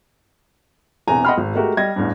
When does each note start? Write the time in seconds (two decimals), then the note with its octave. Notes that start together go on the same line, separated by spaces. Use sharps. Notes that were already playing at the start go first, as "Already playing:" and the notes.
1.07 E1 E2 C3 G#5 A#5
1.25 D#5 F#5 G5 B5 C6 F6
1.38 G#1
1.55 G#3 A3 F#4 G4 A#4
1.77 G3 D#5 G#6 A#6
1.96 A1 E2 G2